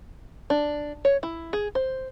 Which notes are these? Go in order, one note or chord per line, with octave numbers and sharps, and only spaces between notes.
D4
C#5
E4
G#4
C5